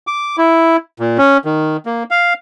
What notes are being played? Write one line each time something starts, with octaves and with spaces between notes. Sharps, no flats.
D6
E4
A#2
C#4
D#3
A#3
F5